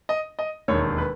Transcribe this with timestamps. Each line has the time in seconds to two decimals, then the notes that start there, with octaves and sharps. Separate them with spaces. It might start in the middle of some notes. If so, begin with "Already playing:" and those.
0.09 D#5
0.39 D#5
0.68 E1 D#2 D#3 C#5
0.98 B4